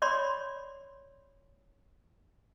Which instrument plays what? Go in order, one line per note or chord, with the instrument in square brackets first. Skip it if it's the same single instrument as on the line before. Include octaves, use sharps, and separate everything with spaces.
[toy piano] C#5 D5 B5 C6